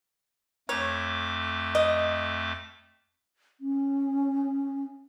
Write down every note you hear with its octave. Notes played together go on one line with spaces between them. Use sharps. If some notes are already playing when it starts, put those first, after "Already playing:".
F2 A3 C#5 D6
D#5
C#4